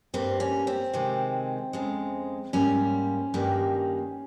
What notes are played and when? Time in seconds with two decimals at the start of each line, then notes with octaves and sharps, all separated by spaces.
0.14 G2 G3 A#3 C4
0.40 C#4
0.67 C4
0.93 C3 D#3 G#3
1.73 F2 C#3 G#3
2.53 G#2 G3 A#3 C#4
3.34 G2 D#3 G3 A#3